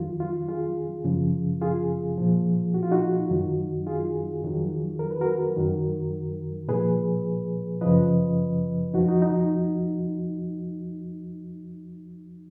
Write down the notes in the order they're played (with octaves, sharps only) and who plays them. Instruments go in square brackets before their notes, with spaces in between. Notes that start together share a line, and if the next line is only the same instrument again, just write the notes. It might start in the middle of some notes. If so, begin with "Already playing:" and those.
Already playing: [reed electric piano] F2 D#3 F#3 F4
F4
F4 G#4
F#2 C#3 F3
F4 G#4
A#2 F3
F#4
F4
D#4 F#4
F#2 D#3 F#3
F4 G#4
F2 D#3 F#3
A#4
B4
F#4 A#4
F#2 D#3 F#3
A#2 F3 G#4 B4
F#2 C#3 F3 B4 D#5
F2 F3 D#4 F#4
D#4 F#4
D#4